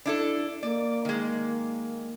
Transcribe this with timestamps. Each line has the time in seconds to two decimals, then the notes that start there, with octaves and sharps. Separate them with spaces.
0.06 D4 E4 A4
0.63 A#3 D5
1.05 D#3 G#3